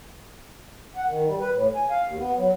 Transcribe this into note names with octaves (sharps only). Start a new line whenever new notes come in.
F#5
D#3
G3
B4
A2
G#5
F5
D#2
B3
F#3